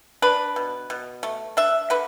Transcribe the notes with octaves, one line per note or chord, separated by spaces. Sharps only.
D4 B4
B2
B2
A3
D4 E5
D3 B4